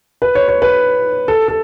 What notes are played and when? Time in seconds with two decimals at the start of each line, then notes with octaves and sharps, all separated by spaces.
0.22 B4
0.35 C#5
0.48 C#5
0.62 B4
1.28 A4
1.48 A4